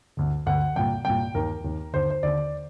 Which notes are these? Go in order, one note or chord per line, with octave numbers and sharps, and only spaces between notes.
D2 D3
D2 D3 F#5
C2 A#2 G5
C2 A#2 G5
D#2 D#3 A#4
D#2 D#3
D#2 D3 C5
C5
D#2 D3 D5